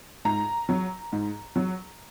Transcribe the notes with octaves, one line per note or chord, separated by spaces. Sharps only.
G#2 A#5
F#3
G#2
F#3